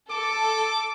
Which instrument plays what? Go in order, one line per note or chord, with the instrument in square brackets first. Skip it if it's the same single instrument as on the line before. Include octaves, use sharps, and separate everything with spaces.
[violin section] A4 [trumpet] D6